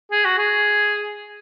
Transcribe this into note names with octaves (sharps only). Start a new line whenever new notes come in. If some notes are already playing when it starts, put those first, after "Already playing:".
G#4
F#4
G#4